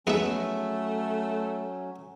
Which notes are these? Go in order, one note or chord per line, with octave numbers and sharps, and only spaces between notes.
F2 F#3 A3 B3 C#4 D#4 G#4 E5